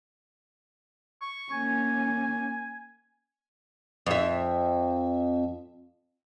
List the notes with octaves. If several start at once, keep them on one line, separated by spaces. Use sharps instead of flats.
C#6
A#3 C#4 G#5
F2 E5